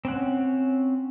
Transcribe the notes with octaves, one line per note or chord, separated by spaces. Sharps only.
C4 C#4 F#5